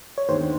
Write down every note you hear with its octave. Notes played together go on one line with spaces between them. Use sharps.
C#5
D#2 D#3 G#3 B3 D4 C5